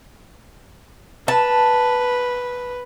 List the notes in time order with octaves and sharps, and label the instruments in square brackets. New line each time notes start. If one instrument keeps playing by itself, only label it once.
[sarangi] B4 [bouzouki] A5